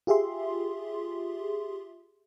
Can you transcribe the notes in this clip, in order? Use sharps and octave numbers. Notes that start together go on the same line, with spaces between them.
F4 G4 G#4 E5 C6